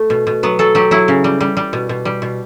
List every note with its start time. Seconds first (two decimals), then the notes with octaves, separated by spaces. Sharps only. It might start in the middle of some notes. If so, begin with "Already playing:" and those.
Already playing: A3
0.10 B2
0.27 B2
0.43 F#3 B3
0.59 F#3 A4
0.75 F#3 G4
0.91 F#3 E4
1.08 C#3
1.24 G3
1.41 G3
1.57 G3
1.73 B2
1.89 B2
2.05 G3
2.22 B2